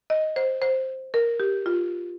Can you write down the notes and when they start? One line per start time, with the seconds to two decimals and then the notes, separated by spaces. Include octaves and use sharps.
0.10 D#5
0.36 C5
0.62 C5
1.14 A#4
1.40 G4
1.66 F4